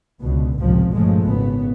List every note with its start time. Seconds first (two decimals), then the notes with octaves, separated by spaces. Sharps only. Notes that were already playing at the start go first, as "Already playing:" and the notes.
0.21 C#2 B2 D3
0.59 G#1 C#2 A2 C3 F3
0.91 G1 A#2 C#3 F3 G#3 A3
1.21 G#1 C#3 B3